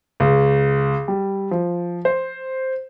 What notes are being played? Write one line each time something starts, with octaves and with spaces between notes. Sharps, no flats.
C#2
G3
F3
C5